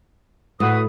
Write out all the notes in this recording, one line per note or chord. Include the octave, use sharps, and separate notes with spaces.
A2 F#4 B4 D#6